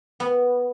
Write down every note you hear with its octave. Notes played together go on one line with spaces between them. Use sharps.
B3